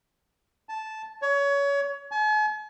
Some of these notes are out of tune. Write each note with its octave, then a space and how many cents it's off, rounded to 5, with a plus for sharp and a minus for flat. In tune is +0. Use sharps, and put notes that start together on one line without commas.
A5 -10
C#5 +25
G#5 +45